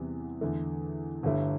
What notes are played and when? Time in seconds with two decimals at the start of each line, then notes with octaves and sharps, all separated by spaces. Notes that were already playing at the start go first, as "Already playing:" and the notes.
Already playing: E2 C3 G3 B3
0.41 E2 D3 A3
1.23 G1 G2 D3 A3 E4